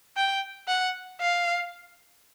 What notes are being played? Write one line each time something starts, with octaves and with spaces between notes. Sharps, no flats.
G5
F#5
F5